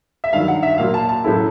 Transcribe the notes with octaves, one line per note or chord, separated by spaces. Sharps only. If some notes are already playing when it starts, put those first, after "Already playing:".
E5
G2 D#3 F#3 F5
F#5
E5
A#2 F#3 A#3 F5
A5
A5
A2 F#3 A3 C#4 E4